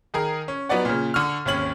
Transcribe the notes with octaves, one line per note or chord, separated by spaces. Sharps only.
D#3 G#4 A#4
C#4
F#3 B3 D#4 D5 F#5
A#2 C#3
D3 C#6 F6
G#1 D#2 C#4 F#7